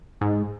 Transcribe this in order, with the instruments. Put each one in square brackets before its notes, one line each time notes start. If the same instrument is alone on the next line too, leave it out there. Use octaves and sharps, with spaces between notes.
[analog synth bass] G#2